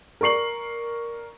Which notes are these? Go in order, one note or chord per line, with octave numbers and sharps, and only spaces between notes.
A#4 D5 C#6 C7 F#7